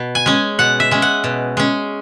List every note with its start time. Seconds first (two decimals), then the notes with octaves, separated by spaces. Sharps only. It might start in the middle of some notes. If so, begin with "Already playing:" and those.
Already playing: B2
0.15 G#5
0.26 G#3 C#4
0.59 B2 F#5
0.80 E5
0.91 G#3 C#4
1.02 F#5
1.24 B2
1.57 G#3 C#4